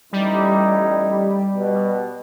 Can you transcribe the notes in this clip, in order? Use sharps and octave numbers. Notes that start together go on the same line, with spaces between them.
A1 G3 D#4 E4
B2